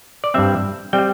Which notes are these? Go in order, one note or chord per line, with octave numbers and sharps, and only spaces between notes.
D5
G2 G3 C4 E5
G3 C4 G5